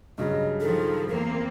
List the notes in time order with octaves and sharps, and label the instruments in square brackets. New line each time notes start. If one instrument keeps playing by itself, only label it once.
[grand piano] G2 C#3 F#3 [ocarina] D#5
[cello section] D#3 F3 [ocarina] A4
[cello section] E2 A#3 C4 [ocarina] A#4